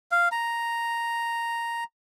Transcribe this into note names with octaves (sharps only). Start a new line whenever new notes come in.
F5
A#5